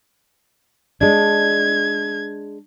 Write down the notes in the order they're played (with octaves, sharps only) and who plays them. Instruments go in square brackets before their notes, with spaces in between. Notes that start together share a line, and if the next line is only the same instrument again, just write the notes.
[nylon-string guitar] G#3 D4 [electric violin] G#6